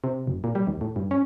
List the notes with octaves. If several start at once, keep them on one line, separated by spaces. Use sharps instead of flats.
C3
F#1
A#2
G3
D#2
A2
G2
C#4